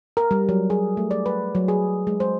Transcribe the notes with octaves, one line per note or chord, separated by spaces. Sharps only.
A#4
G3
F#3
G#4
A3
D5
B4
F#3
G#4
G#3
C5